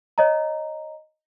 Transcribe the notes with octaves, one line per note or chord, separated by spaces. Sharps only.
C#5 D#5 A#5